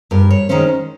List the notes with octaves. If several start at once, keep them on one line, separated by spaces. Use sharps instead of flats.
G2 A#4
C#5
D#3 G#3 C#4 C5